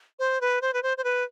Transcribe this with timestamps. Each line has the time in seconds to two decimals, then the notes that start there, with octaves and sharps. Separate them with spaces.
0.19 C5
0.41 B4
0.61 C5
0.73 B4
0.83 C5
0.97 C5
1.04 B4